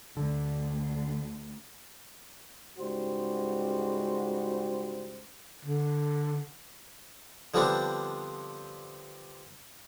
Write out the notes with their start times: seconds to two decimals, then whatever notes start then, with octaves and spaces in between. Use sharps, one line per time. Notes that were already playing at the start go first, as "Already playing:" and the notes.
0.17 D2 D3
2.78 C#2 G#2 G3 F#4 C5
5.65 D3
7.54 D3 F3 G3 B3 C4 D4